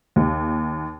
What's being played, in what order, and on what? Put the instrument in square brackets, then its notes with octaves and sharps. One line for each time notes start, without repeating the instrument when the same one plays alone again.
[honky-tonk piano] D#2